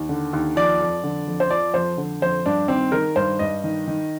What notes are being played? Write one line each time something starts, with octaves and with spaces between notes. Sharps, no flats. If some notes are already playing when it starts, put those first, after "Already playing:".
Already playing: D#2
D3
D#2
F3 D5
F2
D3
F2
C5
F3 D5
F2 C5
D3
F2 C5
G2 D4
D#3 C4
D#3 A#4
G2 C5
G2 D#5
D#3
D#3